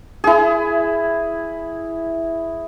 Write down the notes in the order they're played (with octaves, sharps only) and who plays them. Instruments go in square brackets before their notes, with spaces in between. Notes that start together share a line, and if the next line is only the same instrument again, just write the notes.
[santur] E4 G#4